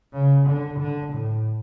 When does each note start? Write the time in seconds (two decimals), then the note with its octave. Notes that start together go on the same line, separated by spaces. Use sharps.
0.13 C#3
0.47 D3
0.79 D3
1.13 A2